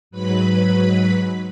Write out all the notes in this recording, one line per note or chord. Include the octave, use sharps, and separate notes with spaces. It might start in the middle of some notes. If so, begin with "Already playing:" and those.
G#2 F#3 B4 B5